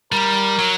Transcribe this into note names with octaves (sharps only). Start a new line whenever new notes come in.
G3 A#4
F#3